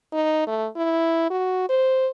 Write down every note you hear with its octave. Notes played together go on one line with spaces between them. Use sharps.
D#4
A3
E4
F#4
C5